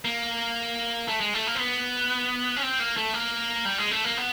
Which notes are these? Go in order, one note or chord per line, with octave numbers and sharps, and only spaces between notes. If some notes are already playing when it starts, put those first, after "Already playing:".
A#3
A3
G#3
A3
A#3
C4
B3
C#4
C4
A#3
A3
A#3
G3
G#3
A3
A#3
B3